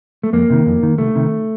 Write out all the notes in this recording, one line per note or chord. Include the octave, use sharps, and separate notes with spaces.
A3
F2 A#3
C3 D#3
F2
D#3
C2 A3
C3 D#3